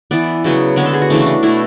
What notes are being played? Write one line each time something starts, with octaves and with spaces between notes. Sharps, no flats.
E3 B3 D5
C#3 F#3 B3
D3 G#3 B3 C#5
A4
G#4
F#4
C#3 E3 A3 D4
D4
B2 A3 E4